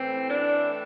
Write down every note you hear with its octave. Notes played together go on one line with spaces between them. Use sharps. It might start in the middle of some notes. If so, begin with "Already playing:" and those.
Already playing: A2 E3 C4
D4